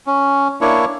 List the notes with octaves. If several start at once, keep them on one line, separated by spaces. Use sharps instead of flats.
C#4
A#3 D4 E4 C#5